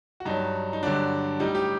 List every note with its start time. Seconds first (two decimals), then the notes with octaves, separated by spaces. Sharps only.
0.20 F#4
0.25 G2 F#3 D#4
0.73 D#4
0.83 G2 D3 F#3 D4
1.40 A2 G3 D#4
1.55 G4